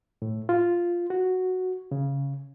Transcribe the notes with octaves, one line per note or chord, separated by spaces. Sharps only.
A2
F4
F#4
C#3